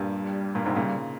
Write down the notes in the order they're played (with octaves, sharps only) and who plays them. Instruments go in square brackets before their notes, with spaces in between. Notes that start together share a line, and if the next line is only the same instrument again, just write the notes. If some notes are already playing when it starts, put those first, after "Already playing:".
Already playing: [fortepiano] G2 A#2 [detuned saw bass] G3
[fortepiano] G2 A#2
G#2 C3
A#2 C#3